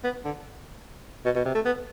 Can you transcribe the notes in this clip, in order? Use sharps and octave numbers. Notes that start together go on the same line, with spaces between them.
B3
D3
B2
B2
C3
A3
B3